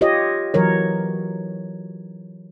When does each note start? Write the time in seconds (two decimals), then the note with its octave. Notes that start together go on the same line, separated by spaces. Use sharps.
0.01 F4 G4 C#5 D#5
0.54 E3 F#3 A#4 C#5